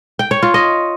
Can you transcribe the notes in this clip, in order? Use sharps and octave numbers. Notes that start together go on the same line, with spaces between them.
G5
C#5
F4
D#5